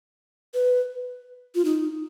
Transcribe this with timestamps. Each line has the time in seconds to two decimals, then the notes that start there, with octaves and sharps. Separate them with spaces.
0.54 B4
1.55 F4
1.65 D#4